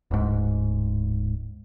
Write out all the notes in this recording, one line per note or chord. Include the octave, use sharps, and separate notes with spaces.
D1 G#2